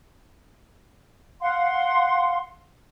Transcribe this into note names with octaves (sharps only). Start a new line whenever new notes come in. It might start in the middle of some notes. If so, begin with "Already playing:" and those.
F5 F#5 C6